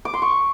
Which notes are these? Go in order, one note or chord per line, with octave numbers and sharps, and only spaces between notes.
D6
C6
C#6